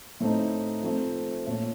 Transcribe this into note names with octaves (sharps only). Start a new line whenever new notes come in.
A2 A3 C4 D#4
F3 A3 C4
A#2 A3 C#4